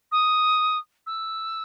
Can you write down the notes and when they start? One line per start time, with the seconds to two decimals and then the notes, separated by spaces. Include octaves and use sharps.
0.12 D#6
1.07 E6